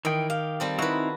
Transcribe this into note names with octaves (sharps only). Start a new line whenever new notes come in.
D#3 E3 G5
G4 F5
G3 C4 A4
C4 D#4 E4 F#4 B4